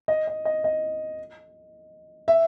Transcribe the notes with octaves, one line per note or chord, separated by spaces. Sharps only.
D#5
D#5
D#5
D#5
E5